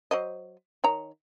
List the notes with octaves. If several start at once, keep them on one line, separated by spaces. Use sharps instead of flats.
F#3 C5 D#5
D#3 C#5 A#5